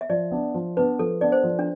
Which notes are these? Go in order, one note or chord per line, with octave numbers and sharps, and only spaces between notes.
E5
F3 D5
B3 D4
F3
B3 D4 B4
F3 A4
B3 D4 D5
C5
F3
D4